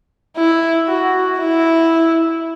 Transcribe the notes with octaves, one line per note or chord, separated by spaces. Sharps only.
E4
F#4
E4